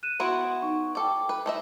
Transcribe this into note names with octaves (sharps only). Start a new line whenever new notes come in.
F#6 D#7 E7
B3 E4 F#4 C6 D7
D#4 C#6
A4 D5 G5 D6
B4
A3 D#5 E5